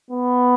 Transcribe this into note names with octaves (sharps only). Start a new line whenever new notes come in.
B3